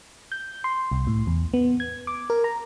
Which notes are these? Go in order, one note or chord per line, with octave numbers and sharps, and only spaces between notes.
G6
C6
C2
A2
E2
B3
G#6
D6
A#4
A#5